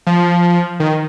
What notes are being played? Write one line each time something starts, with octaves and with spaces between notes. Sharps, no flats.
F3
D#3